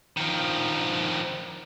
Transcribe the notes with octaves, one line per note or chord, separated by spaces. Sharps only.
D#3 F3